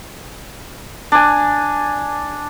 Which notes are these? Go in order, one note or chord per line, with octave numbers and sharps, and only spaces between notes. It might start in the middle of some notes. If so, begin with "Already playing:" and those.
D4 G#5